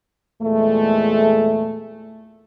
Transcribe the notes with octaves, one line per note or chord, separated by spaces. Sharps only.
E2 A#2 G#3 A3